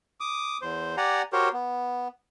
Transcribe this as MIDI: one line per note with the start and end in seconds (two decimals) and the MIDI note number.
0.20 0.57 86
0.20 0.57 87
0.62 0.96 40
0.62 0.96 72
0.97 1.22 67
0.97 1.22 74
0.97 1.22 78
0.97 1.22 80
0.97 1.22 82
1.33 1.49 66
1.33 1.49 67
1.33 1.49 70
1.33 1.49 72
1.33 1.49 73
1.53 2.08 59